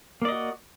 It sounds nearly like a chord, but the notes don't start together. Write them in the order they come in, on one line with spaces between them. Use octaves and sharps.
A#3 D5 D#5 F#4